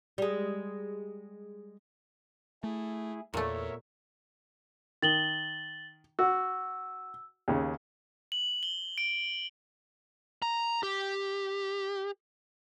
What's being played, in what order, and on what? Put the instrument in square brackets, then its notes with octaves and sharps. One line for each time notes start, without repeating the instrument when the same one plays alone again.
[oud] G3 G#3
[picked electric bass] A3 [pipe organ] E4 G#4
[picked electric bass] E2 [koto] A#2 A3 [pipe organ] A#4 C#5 E5
[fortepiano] D#3 [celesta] A6 F#7 G7
[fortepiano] F#4 [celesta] E6
[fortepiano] D#2 C#3
[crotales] F#7
G7
D7
[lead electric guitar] A#5
G4